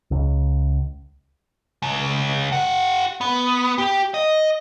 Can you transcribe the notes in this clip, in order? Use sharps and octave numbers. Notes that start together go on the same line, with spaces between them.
C#2
C#2
G4 F#5
B3
G4
D#5